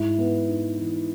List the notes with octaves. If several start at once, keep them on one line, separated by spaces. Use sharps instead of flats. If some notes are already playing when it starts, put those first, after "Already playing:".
Already playing: G#2 E4
B3
D#4
E3